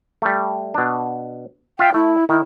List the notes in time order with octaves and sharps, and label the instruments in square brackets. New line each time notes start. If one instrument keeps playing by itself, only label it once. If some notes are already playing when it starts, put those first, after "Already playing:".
[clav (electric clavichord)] G3 A3
B2 D4
[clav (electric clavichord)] F4 E5 F5 [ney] G5
[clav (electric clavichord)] A3 [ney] E4
[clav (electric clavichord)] D#3 [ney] E4